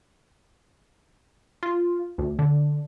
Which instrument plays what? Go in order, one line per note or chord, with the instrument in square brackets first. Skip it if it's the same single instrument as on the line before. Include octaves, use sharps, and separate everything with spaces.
[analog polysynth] F4
D2
D3